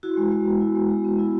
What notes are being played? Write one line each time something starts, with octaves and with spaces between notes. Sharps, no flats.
E4 F#4
G#3
G#3
B3
E4
G#3
G#3
B3
E4